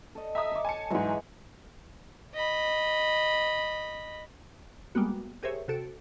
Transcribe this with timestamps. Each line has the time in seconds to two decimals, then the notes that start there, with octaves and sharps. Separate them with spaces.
0.15 A4 D#5
0.35 E5 A#5 D#6
0.52 A4 C#5 D6
0.65 G#5 A5 C#7
0.90 G#2 E3 F#3 G#3
2.34 D#5 B5
4.95 G3 G#3 A#3 B3 F#4
5.43 G4 G#4 A#4 C5 C#5 E5
5.68 C3 F#4 A4 C#7 D7